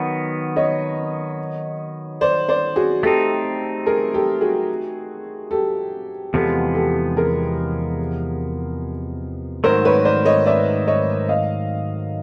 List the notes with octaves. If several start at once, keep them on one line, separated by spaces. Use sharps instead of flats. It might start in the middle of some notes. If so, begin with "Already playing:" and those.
Already playing: D#3 F#3 B3
C#5 D#5
C5 D5
C5 D5
F#4 G#4
A3 C4 D#4 G4 A4
G#4 A#4
G4 A4
F#4 G#4
G4 A4
E2 C3 F3 G#3 B3 G4 A4
G4 A4
G#4 A#4
G#2 D#3 F#3 A3 A#4 C5
B4 C#5
C5 D5
C#5 D#5
D5 E5
C#5 D#5
D#5 F5